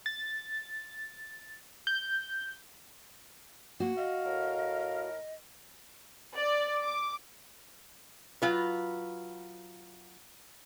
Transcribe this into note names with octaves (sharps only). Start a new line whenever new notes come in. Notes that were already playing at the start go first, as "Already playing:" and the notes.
A6
G6
A#3 F#4
D#5 F5
A2 A#4
D5
D6
F#3 F4 B4